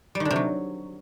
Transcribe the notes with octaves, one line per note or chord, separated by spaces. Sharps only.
G3
D#3
D3
C3
F#3